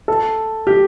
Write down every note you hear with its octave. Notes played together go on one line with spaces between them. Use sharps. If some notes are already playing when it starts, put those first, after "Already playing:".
A4
G4